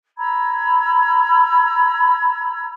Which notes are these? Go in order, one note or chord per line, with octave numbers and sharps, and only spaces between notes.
A#5 B5 E6 G#6